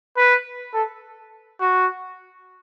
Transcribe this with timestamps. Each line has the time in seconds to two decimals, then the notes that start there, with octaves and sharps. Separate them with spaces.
0.17 B4
0.74 A4
1.61 F#4